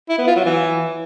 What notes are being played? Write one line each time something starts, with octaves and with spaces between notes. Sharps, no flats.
E4
B3
F4
F#3
E3